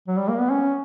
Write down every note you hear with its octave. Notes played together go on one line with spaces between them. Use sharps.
F#3
G3
A#3
B3
C#4